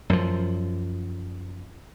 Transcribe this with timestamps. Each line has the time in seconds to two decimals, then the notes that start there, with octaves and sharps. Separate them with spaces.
0.10 F#2 F3